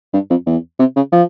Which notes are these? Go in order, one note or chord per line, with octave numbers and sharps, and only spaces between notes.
G2
F2
E2
C3
C#3
F3